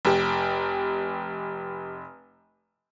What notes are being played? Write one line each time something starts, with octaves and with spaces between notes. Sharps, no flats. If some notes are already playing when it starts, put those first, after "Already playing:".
F1 G4